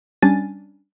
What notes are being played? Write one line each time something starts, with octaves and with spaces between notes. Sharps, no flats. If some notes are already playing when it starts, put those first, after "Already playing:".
G3 C#4 D4 G#5 A6